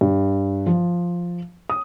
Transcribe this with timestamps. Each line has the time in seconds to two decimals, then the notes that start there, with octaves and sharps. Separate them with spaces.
0.01 G2
0.66 F3
1.70 D#6